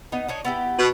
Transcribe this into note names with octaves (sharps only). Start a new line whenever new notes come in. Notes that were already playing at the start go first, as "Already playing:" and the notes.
B3 D#4 D#5
D4 D#4 C#5
B3 E4 G4
B2